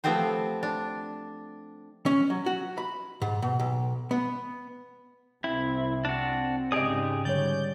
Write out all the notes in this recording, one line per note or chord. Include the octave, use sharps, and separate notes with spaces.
F3 A3 B3 C4 G4 C5
D4
C#4
F#3
F#4
B5
G#2
B2
B1
B3
C2 C4 E4
D4 F#4
G#2 C#3 G4 G#4 D5 D#5 D#6
D3 G3 C#5 D5 G6